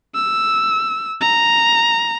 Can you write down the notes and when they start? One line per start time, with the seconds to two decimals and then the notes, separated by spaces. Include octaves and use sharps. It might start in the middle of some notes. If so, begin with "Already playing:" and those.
0.15 E6
1.21 A#5